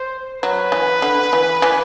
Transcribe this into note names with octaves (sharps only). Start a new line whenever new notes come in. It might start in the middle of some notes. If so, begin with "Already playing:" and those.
Already playing: C5
F#3 B4
E3
D3
E3
E3